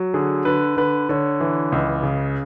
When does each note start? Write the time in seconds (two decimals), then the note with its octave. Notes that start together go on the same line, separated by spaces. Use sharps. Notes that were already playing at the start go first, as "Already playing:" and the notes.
Already playing: F#3
0.14 D3 G#4
0.45 D3 B4
0.77 D3 B4
1.09 D3 C#5
1.40 E3
1.72 C#2
2.03 C#3